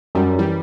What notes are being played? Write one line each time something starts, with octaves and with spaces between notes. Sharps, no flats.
F#2 F#3 G3
E3 G3